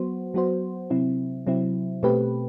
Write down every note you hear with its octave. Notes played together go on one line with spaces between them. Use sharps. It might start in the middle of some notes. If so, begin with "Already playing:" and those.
Already playing: F#3 B3 F#4 C5
F#3 B3 F#4 C5
C3 F#3 C4 E4
C3 F#3 C4 E4
B2 A3 C4 G4 B4